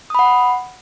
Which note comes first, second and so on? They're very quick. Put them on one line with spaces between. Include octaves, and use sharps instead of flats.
D#6 B5 F#5